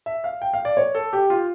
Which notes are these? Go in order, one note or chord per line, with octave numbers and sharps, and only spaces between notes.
E5
F5
G5
F5
D5
C#5
A4
G4
F4